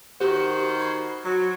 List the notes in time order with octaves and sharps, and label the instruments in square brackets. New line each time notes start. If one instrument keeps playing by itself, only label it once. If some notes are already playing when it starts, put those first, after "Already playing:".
[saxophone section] D#3 F#4 C5 [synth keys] G4
[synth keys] B5 G#6 C7
[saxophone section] F#3 [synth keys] C6